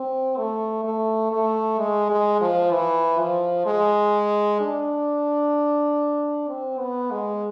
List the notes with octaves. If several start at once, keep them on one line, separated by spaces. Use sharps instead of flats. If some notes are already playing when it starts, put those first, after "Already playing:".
Already playing: C4
A3
A3
A3
G#3
G#3
F3
E3
F3
G#3
D4
C4
B3
G#3